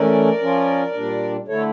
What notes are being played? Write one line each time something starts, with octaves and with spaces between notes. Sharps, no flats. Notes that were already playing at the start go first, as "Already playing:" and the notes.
Already playing: E3 A3 C#4 A#4 D5
F3 C#4 F4
A#2 G3 D4
D3 A3 E4 A4 C#5